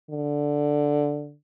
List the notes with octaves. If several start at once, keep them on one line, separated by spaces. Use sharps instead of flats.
D3